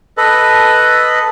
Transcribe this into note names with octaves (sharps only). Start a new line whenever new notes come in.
A4 B4 D#5